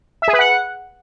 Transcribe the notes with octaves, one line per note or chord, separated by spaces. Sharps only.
E5
G#4
B4
F#5